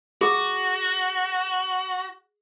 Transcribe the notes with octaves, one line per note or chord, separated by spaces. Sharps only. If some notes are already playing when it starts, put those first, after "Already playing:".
F#4 G#4 D6